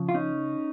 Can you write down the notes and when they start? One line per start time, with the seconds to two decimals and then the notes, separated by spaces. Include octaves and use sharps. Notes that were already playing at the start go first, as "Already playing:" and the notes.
Already playing: C#3 F3
0.09 F4
0.14 C#4 D#4